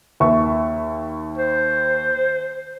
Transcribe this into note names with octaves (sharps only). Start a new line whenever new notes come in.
D#2 E5 C#6
C5